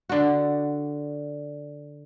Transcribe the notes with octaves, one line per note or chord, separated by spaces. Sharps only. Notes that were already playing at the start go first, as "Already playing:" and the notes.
D3 F#4